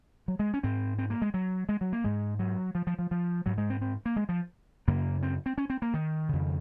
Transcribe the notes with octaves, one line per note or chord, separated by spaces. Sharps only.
F#3
G#3
C#4
G#2 C4
C4
A#3
G#3
F#3
G#3
F#3
A#3
G#2 G#3
F#3
F3
F3
F3
F3
G#2 F#3
G#3
C4
C4
A#3
G#3
F3
F#2 C#3 A#3
C4
C4
C#4
C4
A#3
D#3
F2 C#3